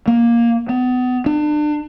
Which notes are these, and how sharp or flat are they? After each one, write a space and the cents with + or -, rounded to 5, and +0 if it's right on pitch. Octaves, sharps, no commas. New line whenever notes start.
A#3 +10
B3 +30
D4 +35